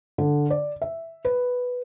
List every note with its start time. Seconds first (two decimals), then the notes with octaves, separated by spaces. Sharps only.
0.18 D3
0.50 D5
0.82 E5
1.25 B4